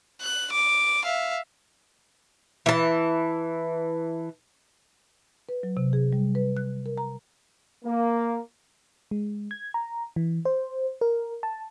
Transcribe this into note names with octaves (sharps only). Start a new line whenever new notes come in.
F#6
D6
E5 F5
E3 A5
B4
F#3
C3
G#4
G3
B4
F#6
A#4
A#5
A#3
G#3
G#6
A#5
E3
C5
A#4
A5